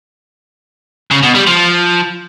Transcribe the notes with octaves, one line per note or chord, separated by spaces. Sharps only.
C#3
B2
G3
F3